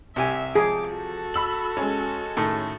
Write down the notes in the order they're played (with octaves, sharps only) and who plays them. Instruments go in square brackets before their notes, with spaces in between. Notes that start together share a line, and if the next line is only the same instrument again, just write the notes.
[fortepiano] C2 G4 G#5 [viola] E5
[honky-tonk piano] F3 [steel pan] G#4 [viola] D6
[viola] F#4 A4
[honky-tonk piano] B5 E6 F#7
G#3 C#4
[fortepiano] A2 D#3 A3